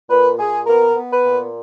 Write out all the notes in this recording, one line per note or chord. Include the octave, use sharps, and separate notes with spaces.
A#2 B4
A#2 G#4
B3 A#4
B3
B4
A#2